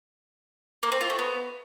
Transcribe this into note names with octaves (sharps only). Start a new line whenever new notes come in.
A#3
C4
F4
A3
B3